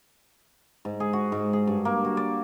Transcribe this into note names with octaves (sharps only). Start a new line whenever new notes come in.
G#2
G#4
F#4
G#2
G#4
G2
A#3
F#4
D5